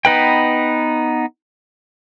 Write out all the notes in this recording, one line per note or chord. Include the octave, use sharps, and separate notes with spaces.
B3 D#4 B4 G5